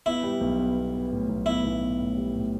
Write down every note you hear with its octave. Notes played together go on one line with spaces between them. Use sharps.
B3 E4
G3
B1
B3
B3
B3
A2
B1
B3 E4
B1
B3
A2
G3
A2